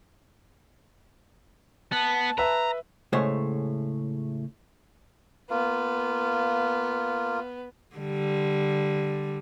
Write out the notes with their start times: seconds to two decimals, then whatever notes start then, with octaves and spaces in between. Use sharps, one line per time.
1.92 B3 A5
2.38 B4 E5 A#5
3.13 A2 C#3 G#3 A3 C5 C#5
5.50 A#3 B3 F4
7.96 D3 G3